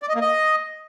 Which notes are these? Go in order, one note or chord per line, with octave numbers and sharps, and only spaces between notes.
D5
D#5
A#3
D#5